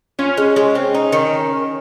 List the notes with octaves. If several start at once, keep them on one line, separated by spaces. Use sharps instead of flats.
C#4 F4
G#3
G#3
C4
D#4
D#3